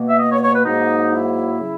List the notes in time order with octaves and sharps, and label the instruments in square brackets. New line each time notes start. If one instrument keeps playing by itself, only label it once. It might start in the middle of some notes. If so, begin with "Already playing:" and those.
Already playing: [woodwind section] B2 A#3
E5
D#5
C#5
C#5
B4
G#2 F#3 A#3 D#4
E4
C#3 F#3